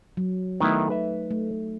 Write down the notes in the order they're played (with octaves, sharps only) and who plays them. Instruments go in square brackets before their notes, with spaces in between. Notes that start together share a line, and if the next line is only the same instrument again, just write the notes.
[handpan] F#3
[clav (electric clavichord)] D#3 B3 E4 [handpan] A3 D#4
[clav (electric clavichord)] B4 E5
[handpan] A3